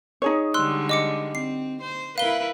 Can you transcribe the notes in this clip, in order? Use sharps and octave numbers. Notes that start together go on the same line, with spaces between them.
D#4 G#4 C#5
D3 G3 G#3 C6 E6 F#6
D#5 D6 C#7
C4 C7
C5
E4 A#4 B4 F5 G7